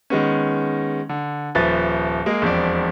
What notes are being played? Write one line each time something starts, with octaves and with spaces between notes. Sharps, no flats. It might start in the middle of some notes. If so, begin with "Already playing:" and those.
D#3 G#3 B3 C#4
D3
D#1 F3 B4 E5 A6
G#3 A#3 G#4
E1 F2 C4 D5